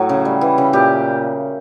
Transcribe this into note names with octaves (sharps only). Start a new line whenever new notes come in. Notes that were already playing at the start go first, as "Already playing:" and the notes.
Already playing: A2 F#3
C#3
G3
E3
C#3
A#2 G4